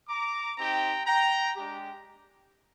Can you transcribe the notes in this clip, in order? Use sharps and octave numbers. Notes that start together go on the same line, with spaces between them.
A#5 D6
C4 D#4 G4 G5 A#5
G5 A#5
G#3 D4 G4